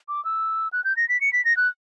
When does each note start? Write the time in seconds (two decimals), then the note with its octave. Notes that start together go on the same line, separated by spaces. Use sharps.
0.08 D6
0.25 E6
0.73 F#6
0.84 G6
0.97 A#6
1.09 B6
1.21 C#7
1.33 B6
1.45 A#6
1.57 F#6